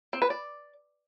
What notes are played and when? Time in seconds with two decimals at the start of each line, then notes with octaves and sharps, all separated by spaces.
0.13 C4
0.22 B4
0.30 D5